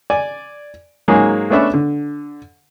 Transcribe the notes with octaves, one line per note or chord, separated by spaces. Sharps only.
D5 G#5
G#2 F#3 G#3 A#3 C#4 G#4
A3 B3 C#4 D4 B4 E5
D3